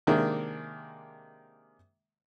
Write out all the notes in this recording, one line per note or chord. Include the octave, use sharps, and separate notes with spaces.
C3 D#3 G#3 A#3 D4